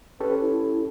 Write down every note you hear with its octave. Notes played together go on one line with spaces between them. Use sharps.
C#4 G4 A4 B4
E4